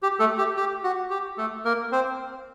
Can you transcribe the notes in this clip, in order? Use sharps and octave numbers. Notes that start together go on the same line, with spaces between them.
G4
A3 A4
G4
G4
F#4
G4
A3 A4
A#3 A#4
C4 C5